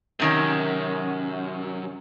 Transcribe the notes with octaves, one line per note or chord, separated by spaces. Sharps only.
F#2 C3 D#3 C#4